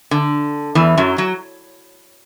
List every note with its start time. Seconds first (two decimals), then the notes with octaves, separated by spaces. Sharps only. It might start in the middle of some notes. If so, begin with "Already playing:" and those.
0.11 D3
0.75 E2 E3
0.97 F#2 F#3
1.18 F#3